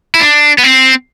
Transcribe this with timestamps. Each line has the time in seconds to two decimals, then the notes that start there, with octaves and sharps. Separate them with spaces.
0.15 E4
0.21 D4
0.58 B3
0.64 C4